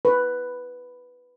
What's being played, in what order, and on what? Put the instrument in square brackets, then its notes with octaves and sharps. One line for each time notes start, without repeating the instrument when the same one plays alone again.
[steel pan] B4